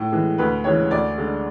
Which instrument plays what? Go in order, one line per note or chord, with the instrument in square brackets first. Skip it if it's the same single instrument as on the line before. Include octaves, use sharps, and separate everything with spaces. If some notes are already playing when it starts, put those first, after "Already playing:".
Already playing: [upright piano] A2
E3 G#3
D2 B4
C#3 E3 G#3 C#5
D2 D5
D3 G#3